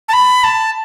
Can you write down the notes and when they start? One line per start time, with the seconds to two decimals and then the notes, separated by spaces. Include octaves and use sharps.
0.09 A5
0.13 B5
0.44 A5